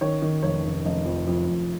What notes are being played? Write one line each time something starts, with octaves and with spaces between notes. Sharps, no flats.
D#3 C#5
D#3
F1 C#5
F1
F1 D#5
F2
F2
F1